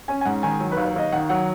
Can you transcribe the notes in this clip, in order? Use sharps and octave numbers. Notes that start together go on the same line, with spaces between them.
C#4 G#5
G#5
G#2 F#5
D#3 G#5
F#3
B4
D#2
C#5
D#2 D#5
D#3 F#5
F#3 F#5